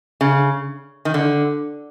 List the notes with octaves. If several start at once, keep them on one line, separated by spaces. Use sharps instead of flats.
C#3
D#3
D3